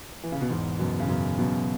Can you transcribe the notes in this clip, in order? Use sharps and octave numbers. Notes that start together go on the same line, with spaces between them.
E3
C#3
B2
E2 G#2
F#2 B2
C#3
F#2 B2
F#2 B2